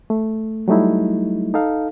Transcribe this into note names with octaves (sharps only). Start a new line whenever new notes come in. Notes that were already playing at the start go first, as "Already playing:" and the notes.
A3
F#3 G3 A3 D#4 E4
D#4 A4 F5